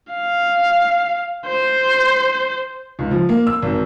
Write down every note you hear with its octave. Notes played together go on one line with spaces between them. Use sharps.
F5
C5
C#2
F3
A#3
E6
G#1